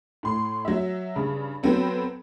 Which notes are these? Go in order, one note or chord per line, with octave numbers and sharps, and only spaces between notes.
A2 C6
F#3 E5
G2 C#3
F#3 B3 C4 A4